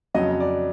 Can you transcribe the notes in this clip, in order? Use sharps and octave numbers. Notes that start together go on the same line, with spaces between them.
F2 C#3 F#3 D#5
D5